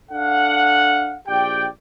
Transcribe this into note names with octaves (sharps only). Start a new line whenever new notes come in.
D4 A4 F5 F#5
A#1 G4 D5 G5